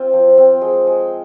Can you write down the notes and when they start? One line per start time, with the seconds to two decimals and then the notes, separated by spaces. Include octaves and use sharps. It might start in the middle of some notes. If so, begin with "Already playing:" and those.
Already playing: C4 F4
0.13 F3
0.38 C4
0.61 G#3
0.87 G#3